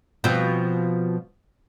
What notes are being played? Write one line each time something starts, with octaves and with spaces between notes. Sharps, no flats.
B2 F3 C4